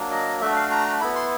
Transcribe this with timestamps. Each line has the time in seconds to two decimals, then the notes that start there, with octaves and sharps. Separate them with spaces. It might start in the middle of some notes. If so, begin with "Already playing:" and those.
Already playing: F#3 A#3 D4
0.11 D#5
0.41 A3 D4 F#4 E5
0.56 F5
0.71 A#5
1.01 B3 E4 B5
1.16 C6